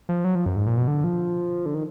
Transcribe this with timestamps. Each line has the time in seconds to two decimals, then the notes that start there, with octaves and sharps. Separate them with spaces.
0.09 F3
0.24 F#3
0.35 F3
0.46 F#2
0.56 G#2
0.67 A#2
0.77 B2
0.88 D3
1.04 F3
1.66 D3
1.74 D#3